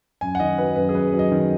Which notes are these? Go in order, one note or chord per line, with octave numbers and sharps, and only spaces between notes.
F#2 G#5
F#5
D#3 D#5
F#3 B4
F#2 B4
G#4
F#2 B4
F#3
D#5
D#3